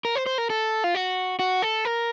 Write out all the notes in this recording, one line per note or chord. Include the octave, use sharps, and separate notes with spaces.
A#4
C5
C5
A#4
A4
F4
F#4
F#4
A4
A#4